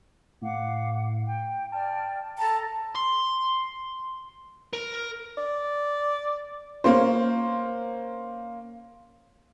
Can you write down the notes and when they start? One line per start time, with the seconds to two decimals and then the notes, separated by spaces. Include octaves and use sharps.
0.41 A2 F5 F#5 D6
1.27 G5
1.72 D5 G5 A5 F6
2.38 A4 A5 A#5 A6
2.96 C6
4.73 A#4
5.38 D5
6.84 A#3 C#4 C5